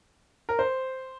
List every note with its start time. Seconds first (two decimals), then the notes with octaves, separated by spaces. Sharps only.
0.49 A#4
0.59 C5